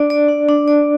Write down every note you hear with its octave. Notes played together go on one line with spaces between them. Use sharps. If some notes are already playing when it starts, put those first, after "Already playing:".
Already playing: D4 D5
D5
D4
D4
D5